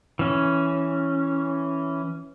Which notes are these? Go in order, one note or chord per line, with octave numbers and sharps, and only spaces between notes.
E3 C#4